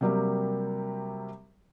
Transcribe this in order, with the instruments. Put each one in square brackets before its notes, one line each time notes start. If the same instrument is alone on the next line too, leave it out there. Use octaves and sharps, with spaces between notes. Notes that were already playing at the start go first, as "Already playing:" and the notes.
[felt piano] C3 F#3 G3 A#3 G4 A#4